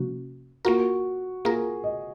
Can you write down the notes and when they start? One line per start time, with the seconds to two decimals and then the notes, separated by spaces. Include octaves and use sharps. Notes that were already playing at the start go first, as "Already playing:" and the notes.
Already playing: C3 F3 A#3 C#4 F#4
0.65 A#3 F4 F#4 A#4
1.45 A#3 F4 G#4 A#4
1.84 D#5